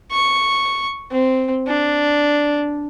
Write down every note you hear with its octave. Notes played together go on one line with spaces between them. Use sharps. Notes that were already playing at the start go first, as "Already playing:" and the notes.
C#6
C4
D4